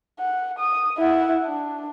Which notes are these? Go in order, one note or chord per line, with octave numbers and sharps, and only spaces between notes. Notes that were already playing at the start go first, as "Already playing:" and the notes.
F#5
D#6
E4 F#5
D4